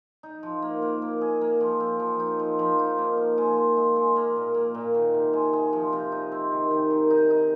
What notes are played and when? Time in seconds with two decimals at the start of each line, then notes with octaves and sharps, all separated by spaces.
0.23 D#4
0.43 F3
0.62 A#3
0.82 A#3
1.02 A#3
1.21 G#4
1.41 A#3
1.61 F3
1.80 C4
2.00 F3
2.20 D#4
2.39 F3
2.59 F3
2.79 D#4
2.98 A#3
3.17 A#3
3.38 G#3
3.57 F4
3.77 G#3
3.96 G#3
4.16 A#3
4.36 A#2
4.55 A#3
4.74 A#2
4.94 D#3
5.14 C3
5.33 G#3
5.53 G#3
5.73 F3
5.93 C3
6.12 D#4
6.32 C4
6.51 D#3
6.71 D#3
6.91 D#3
7.10 D#4
7.30 D#4